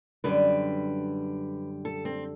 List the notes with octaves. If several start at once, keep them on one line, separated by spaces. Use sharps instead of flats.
F#2 D3 G3 B4
A4
C4